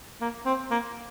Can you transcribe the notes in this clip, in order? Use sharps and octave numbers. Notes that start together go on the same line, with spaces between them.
A#3
C4
A#3